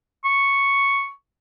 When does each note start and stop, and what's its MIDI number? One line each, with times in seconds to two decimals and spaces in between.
0.25 1.09 85